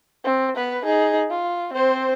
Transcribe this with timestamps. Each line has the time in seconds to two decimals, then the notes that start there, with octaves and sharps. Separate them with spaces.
0.24 C4
0.55 B3 B4
0.85 D#4 G#4
1.30 F4
1.73 C4 C5